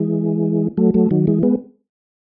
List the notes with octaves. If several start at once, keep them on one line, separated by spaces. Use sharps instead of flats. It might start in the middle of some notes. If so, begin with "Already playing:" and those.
Already playing: E3 G#3
F#3 A3
F#3 A3
D#3 F#3
E3 G#3
G#3 B3